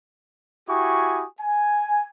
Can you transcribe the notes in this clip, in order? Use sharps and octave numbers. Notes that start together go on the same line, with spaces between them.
E4 F#4 G4 G#5 C#6 D#6
G#5